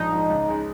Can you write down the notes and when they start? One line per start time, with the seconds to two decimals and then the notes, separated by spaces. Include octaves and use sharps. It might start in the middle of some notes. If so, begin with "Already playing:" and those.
Already playing: A#1 G#2 F3 D#4
0.11 G#2 F3
0.30 C#2
0.48 C#3 G#3